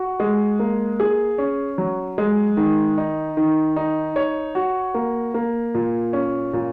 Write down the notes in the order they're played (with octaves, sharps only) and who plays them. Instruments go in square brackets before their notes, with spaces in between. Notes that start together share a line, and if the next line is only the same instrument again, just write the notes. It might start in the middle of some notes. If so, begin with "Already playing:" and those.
Already playing: [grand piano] F#4
G#3
A#3
G#4
C#4
F#3
G#3
D#3
D#4
D#3
D#4
C#5
F#4
A#3
A#3
A#2
C#4
A#2